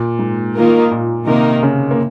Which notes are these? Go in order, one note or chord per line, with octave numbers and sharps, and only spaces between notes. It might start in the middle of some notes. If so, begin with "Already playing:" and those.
Already playing: A#2
G#2
D#3 A#3 F4 A#4
A#2
C3 D#3 A#3 D#4 A#4
C#3
A#3